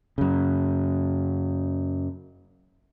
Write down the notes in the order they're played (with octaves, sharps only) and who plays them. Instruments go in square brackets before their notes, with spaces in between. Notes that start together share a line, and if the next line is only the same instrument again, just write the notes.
[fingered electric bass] F#2 C#3